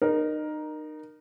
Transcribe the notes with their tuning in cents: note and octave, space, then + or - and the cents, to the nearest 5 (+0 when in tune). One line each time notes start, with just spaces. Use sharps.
D#4 -30 A#4 +10